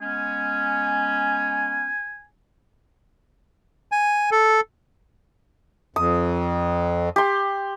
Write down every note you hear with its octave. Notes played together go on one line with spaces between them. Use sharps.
G#3 B3 C#4 G#5
G#5
A4
F2 D#6
G4 C6